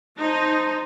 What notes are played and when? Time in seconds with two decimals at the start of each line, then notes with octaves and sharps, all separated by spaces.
0.19 D#4 C5 A5